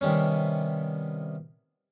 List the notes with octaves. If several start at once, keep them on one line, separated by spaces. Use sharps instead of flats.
C3 D#3 G3 B3 C#4